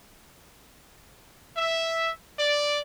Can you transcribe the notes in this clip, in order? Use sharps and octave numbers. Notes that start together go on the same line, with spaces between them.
E5
D5